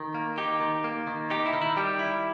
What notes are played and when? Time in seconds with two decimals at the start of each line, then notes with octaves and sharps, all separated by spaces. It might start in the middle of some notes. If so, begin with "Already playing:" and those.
Already playing: D#3
0.15 A#3
0.38 D#4 G4
0.60 D#3
0.84 A#3
1.07 D#3
1.30 D#4 G4
1.46 E4
1.53 D#3
1.62 E4
1.77 G3 G4
1.99 E4